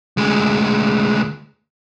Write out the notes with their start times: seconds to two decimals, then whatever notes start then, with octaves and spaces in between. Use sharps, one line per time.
0.17 D2 G#3